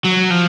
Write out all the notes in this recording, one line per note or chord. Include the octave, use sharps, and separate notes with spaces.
F#3
F3